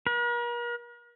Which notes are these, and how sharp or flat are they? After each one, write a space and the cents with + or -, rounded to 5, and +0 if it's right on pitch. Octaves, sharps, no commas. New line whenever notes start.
A#4 +45